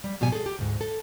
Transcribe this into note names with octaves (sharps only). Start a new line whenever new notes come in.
G3
G#2 B2 F#3 G3 G#5
G#4 A4
G4
D2 G#2
A4